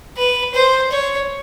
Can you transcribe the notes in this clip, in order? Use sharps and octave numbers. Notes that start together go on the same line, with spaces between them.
B4
C5
C#5